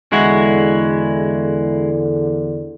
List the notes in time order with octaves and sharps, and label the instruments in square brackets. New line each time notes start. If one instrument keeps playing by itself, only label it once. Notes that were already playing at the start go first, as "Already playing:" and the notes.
[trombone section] E2 D3 [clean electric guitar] G#3 E4 F#4